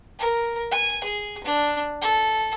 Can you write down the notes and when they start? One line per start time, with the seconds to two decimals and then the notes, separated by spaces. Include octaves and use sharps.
0.19 A#4
0.71 G#5
1.04 G#4
1.44 D4
2.02 A4